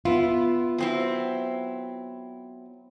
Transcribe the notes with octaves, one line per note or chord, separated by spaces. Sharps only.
B3 E4 F4
F#3 C4 E4